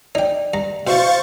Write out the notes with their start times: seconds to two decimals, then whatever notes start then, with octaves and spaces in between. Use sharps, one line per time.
0.15 D#4 D5 G5
0.54 G2 A#5
0.87 B2 E4 C5 F5 C#6 A6